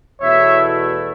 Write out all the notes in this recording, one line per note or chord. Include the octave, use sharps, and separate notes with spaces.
E2 B2 A3 E4 C#5 E5